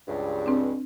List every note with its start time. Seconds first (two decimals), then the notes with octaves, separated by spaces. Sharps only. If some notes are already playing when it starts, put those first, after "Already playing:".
0.08 C#2 G2
0.46 C4 D4